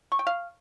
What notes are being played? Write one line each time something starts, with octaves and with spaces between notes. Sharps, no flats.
C#6
G5
F5